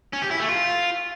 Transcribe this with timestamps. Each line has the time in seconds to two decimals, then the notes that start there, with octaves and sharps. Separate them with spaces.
0.13 C#4
0.22 G4
0.31 E4
0.40 A3
0.49 F4